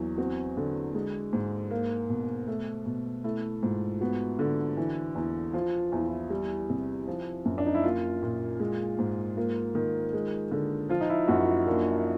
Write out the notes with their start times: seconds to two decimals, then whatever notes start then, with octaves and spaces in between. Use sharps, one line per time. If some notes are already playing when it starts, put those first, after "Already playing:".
Already playing: E2 F#3
0.17 C4 F#4
0.57 D3
0.94 G#3
1.33 G#2
1.71 A#3
2.09 B2
2.48 A3
2.86 B2
3.24 A3 E4
3.63 G#2 F4
4.01 B3 F#4
4.39 D3
4.77 E3
5.15 E2
5.53 F3 F4
5.92 E2 E4
6.00 F4
6.07 E4
6.30 G3 E4
6.69 C3
7.07 F3
7.45 F#2
7.58 D4
7.66 D#4
7.75 E4
7.84 A#3 F4
8.23 A#2
8.60 G#3
8.99 G#2
9.37 A#3 F4
9.75 D#3
10.13 G#3
10.51 D3
10.89 F3 F4
11.01 D#4
11.10 E4
11.28 F#2 F#4
11.47 F4
11.66 A#3 D4